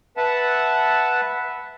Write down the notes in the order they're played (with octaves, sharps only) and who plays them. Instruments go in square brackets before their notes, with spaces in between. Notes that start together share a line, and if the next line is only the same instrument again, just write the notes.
[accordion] B4 E5 F#5 A5